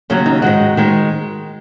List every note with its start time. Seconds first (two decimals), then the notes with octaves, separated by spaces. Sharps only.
0.10 D#2 C#3 F#3 C#4
0.26 D#4
0.42 G#2 D#3 G#3 F#4
0.77 D#3 G#3